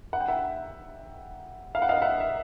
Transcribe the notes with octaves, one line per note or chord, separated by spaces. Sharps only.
F#5
G5
E5 F#5
F5
F#5
D#5 F5
E5 F#5
E5